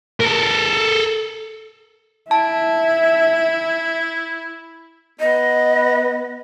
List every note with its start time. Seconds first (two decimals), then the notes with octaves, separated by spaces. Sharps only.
0.20 A4 A#4
2.31 E4 E5 A5
5.20 B3 D#5